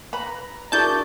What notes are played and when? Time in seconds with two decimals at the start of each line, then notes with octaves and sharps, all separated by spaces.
0.13 B4 A#5 B5
0.72 D4 E4 F#4 G#4 A#4 D5 A5 G6